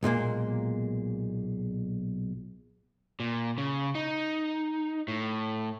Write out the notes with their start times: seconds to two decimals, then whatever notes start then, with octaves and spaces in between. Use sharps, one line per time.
0.03 B1 A#2 G#3 A#3
3.20 A#2
3.58 C#3
3.95 D#4
5.08 A2